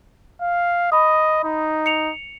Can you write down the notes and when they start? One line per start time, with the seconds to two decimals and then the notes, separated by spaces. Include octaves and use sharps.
0.41 F5
0.92 D#5 B5 D#6
1.44 D#4
1.86 C#7 F7